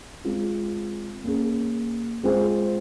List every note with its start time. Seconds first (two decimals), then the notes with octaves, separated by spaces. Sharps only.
0.25 G#3 C4 F4
1.24 A#3 C#4 G#4
2.23 G#3 C4 F4 G#4 C5